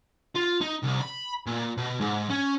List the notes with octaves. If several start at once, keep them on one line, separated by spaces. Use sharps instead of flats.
F4
D#4
C2
B5
A#2
B2
G#2
C#4